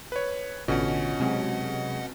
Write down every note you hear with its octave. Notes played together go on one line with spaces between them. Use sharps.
B4 C#5
A1 B2 D3 C#4 F4 D#5 F#5
C3 F#3 G#3 C4